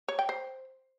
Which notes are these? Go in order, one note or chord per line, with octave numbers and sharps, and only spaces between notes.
C#5
G5
C5